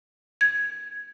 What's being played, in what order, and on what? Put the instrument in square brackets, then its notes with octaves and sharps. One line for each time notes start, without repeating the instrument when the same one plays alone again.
[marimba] G#6